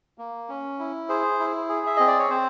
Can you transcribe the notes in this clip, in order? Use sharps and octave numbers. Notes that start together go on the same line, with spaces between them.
A#3
C#4
E4
G#4 C5
E4
G#4
E5
C4 D#5
D5
C#5
C4 C5